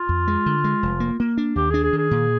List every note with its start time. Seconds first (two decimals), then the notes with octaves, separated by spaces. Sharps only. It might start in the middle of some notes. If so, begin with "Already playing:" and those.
Already playing: F4
0.09 F2
0.28 G#3
0.46 D3
0.64 G#3
0.83 F1
1.00 A#3
1.20 A#3
1.37 D4
1.55 D#2 G4
1.70 D4 G#4
1.84 G#4
1.93 D#3
1.98 G#4
2.11 A#2